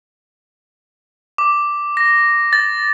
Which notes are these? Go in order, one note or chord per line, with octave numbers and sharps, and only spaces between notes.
D6
A#6
A6